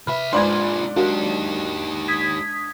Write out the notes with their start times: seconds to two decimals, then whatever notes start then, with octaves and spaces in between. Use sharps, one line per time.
0.07 C2 B4 E5 F6
0.33 G#2 D4 F4 B4 C5 D5 G#5 C6
0.96 F#3 A#3 D4 D#4 G4
2.08 D#6 G#6 B6